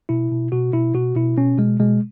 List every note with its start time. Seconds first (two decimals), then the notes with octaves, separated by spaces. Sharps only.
0.09 B2 E4
0.31 B2
0.52 B2 F#4
0.73 B2 E4
0.95 B2 F#4
1.15 B2 E4
1.37 B2 C#4
1.58 B2 G#3
1.80 B2 G#3